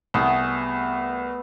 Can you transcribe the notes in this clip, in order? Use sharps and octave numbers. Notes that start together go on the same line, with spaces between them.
C2 A3 B3 G#4